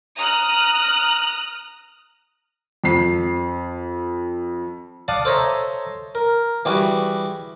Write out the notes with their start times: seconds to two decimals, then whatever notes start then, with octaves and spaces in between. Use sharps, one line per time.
0.18 A#5 D#6 F6 F#6
2.84 F2 C7
5.08 D5 F5 F#5 A5 D6 D#6
5.25 A4 C5 C#5 D#5 E5 A#5
6.15 A#4
6.65 E3 G3 G#3 F#4 B4